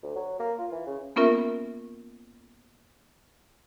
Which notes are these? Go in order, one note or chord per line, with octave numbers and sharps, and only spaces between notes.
D2
F#3
A#3
F4
E3
C#3
A#3 B3 C#4 F4 A#4 E5